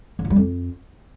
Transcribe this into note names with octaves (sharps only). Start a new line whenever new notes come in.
E2
E3
G3
F2